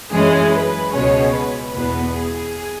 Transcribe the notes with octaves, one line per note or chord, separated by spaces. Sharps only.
F#2 E3 G#3 C#4 G#4
B4
C#2 B2 G#3 C#4 C#5
B4
E2 B2 B3 B4
G#4